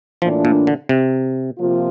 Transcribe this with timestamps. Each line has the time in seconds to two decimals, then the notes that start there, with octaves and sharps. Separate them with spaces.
0.22 A2 E3 F3 A#3 D4 F4
0.45 A#2
0.67 D3
0.89 C3
1.58 C3 F3 A#3 F4